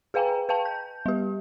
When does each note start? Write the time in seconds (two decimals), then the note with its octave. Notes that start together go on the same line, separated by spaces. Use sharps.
0.14 G#4 B4 F5 G5 G#5 A#5
0.49 B4 F5 G5 A5
0.65 G6
1.06 G3 G4